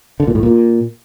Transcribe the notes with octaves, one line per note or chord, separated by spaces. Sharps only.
D3
A#2
A2
A#2